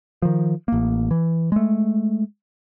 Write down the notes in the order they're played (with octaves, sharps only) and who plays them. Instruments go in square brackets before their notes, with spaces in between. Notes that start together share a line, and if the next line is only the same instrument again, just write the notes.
[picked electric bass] D#3 F3
A1 A#3
E3
G#3 A3